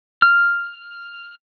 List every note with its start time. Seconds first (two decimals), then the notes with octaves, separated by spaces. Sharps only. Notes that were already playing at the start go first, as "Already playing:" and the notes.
0.22 F6